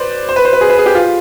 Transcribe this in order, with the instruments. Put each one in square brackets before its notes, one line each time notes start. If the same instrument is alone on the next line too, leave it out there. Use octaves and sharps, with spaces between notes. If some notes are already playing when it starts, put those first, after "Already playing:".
Already playing: [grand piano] B4 C5 D5
C5
B4
C5
B4
G#4
B4
G#4
G4
F4